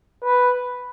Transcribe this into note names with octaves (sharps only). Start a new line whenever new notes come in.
B4